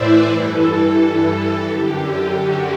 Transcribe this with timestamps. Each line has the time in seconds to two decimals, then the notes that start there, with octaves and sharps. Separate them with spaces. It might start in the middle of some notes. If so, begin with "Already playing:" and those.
Already playing: A2 E3 B4 C5 D5 E5
0.26 G2 E3 A4
0.96 A4
1.30 A4
1.64 F#2 D3 G4
2.34 F#4